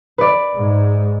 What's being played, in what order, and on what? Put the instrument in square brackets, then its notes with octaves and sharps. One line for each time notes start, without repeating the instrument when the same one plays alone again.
[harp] B4 D5
[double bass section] G#2